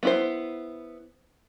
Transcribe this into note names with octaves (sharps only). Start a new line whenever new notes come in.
B3 E4 C5